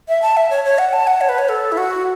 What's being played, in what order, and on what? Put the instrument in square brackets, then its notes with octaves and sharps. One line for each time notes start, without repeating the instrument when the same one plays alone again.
[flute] E5
A5
E5
C#5
C#5
F#5
A5
F#5
C#5
B4
C#5
A4
E4
F#4